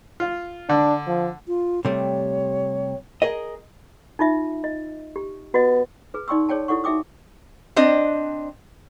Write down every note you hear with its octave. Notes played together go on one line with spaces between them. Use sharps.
F4
D3 D4
F3
F4
C3 G3 A3 C#5
G#4 A#4 D#5
D#4 F4 E5
D#5
G4
B3 F#4 D#5
G#4 B4
D#4 D5 G5 C6 C#6 E6
G#4 C#5 D5 G5 A5
E4 G4 A4 D5 F#5 C#6
D#4 F#4 E5 G5 D6 D#6
C4 D4 D#5